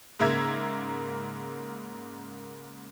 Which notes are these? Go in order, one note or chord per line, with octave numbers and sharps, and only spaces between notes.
G#2 C#3 A#3 E5 A#5 G#6